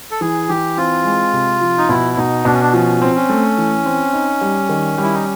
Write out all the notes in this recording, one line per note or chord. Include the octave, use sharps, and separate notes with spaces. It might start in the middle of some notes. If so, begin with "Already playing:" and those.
A4
E3 G#4
E3 G4
C4 F4
G#3
C3
F3
D#4
B2 E4
B2 D#4
B2 D4
C#4
D4
F3 C#4
C4
C#4
A3
E3
C4
D#4
G3
D#3
G3
E4
D#4